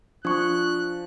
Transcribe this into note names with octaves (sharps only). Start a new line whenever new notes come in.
F3 D4 C#6 F#6